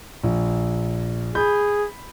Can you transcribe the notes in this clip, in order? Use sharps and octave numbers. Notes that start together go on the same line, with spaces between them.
A#1
G#4 B5 G6